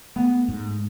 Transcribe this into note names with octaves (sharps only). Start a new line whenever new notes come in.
A3 B3
G#2